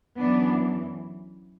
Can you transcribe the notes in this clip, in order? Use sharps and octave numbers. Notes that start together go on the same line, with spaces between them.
F#2 E3 B3 D4